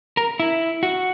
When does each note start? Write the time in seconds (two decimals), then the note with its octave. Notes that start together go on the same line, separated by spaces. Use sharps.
0.17 A#4
0.40 E4
0.83 F#4